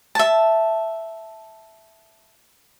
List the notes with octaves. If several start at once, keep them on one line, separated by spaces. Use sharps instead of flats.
E5 A5